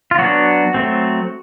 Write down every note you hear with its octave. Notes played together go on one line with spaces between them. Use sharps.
F4
F#3 B3 D4 F#4
F#3 A3 C4